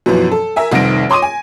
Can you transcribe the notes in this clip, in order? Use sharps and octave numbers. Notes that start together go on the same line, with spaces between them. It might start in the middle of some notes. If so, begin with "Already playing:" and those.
F#2 B2 E3 F3
A4
A#4 E5 G#5
F1 C2 D#3 C4 A#6 D7
C#5 C6 D6 D#6 D#7
G#5